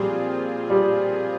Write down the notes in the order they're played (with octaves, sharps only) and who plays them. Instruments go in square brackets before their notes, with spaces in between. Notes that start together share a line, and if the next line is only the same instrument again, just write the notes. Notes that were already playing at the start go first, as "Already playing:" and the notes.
Already playing: [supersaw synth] A#2 F3 C4 F4 G#4 [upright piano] G3
[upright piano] G3